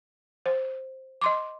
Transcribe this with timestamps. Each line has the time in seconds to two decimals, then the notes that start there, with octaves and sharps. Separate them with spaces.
0.46 C5
1.21 D#5 C6 D6